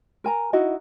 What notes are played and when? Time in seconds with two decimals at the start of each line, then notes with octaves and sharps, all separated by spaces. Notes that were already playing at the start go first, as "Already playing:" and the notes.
0.24 A#4 G#5 A#5
0.53 D#4 E4 F#4 D#5